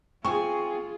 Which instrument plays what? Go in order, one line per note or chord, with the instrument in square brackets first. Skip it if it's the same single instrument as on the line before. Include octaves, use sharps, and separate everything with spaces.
[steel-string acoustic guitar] C4 G#5 [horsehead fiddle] F4 G#4 [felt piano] C#6